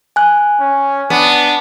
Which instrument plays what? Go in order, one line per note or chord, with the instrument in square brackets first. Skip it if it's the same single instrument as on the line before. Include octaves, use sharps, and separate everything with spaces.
[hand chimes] G#5 F#6
[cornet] C#4
[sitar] B3 [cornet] D4